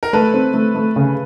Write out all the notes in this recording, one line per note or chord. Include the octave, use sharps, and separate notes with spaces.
A#4
A3 A4 B4
C4
A3
A3
C#3